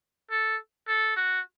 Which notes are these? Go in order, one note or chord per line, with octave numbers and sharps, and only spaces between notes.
A4
A4
F#4